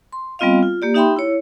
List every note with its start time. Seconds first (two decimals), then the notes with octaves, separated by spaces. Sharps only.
0.13 C6
0.39 G3 B3 C4 F4 D#5 F5
0.63 F4
0.82 A#3 G4 D5
0.94 D#4 G4 E5 G5 B5 C6
1.16 E4 C#5